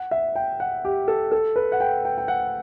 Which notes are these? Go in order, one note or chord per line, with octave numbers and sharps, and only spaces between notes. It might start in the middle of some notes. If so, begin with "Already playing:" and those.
Already playing: F#5
E5
G5
F#5
G4
A4
A4
B4
F#5
G5
G5
G5
F#5